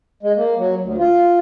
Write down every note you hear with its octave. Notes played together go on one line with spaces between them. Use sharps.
G#3
A#3
F#3
D2
F4